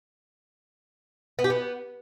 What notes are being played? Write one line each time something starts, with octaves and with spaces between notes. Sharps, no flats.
B3
G4
B3